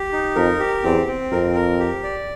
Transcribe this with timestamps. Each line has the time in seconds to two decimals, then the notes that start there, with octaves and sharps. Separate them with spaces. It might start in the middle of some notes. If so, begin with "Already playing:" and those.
Already playing: G4
0.13 D#4
0.35 F2 A#4
0.60 G4
0.83 E2 C4
1.07 C4
1.32 F2 A#4
1.55 A#4
1.80 G4
2.03 D5